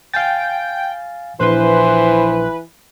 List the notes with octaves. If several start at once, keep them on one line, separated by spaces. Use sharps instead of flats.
F5 G5 G#5 A6
A#1 E3 E4 B4 C5 C6